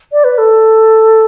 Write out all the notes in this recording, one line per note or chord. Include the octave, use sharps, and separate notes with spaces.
D5
B4
A4